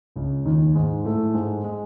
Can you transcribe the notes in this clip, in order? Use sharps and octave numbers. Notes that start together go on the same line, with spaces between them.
C#2 C#3
D#2 D#3
G#2 G#3
A2 A3
G#2 G#3
G#3